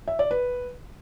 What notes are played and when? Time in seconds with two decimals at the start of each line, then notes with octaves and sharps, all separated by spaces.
0.08 E5
0.19 D5
0.31 B4